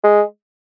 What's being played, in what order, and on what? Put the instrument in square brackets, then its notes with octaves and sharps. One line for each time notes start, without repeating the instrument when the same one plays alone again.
[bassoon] G#3